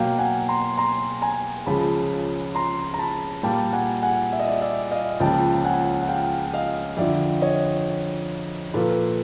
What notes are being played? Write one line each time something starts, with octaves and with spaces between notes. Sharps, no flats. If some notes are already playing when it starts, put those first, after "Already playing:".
Already playing: B2 F#3 A#3 F5 G5
F#5 G#5
A#5 C6
A#5 C6
G#5 A#5
C#2 C#3 F3 G#3 A5 B5
A#5 C6
A#5
A5 B5
A#2 G3 A#3 G5 A5
F#5 G#5
F#5 G#5
E5
D#5
D5 E5
D5 E5
D#5 F5
C#2 C#3 F3 A#3 G5 A5
F#5 G#5
F#5
F5 G5
D#5 F5
F2 D3 F3 D5 E5
C#5 D#5
A#2 F3 A#3 A4 B4